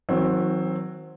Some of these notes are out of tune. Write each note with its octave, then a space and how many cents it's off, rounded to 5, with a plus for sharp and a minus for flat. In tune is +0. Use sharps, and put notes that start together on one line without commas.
D#3 +40 F#3 -15 C4 +10